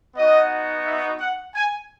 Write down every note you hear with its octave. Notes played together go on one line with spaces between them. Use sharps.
B3 D#4 F#4 D#5
E5
F#5
G#5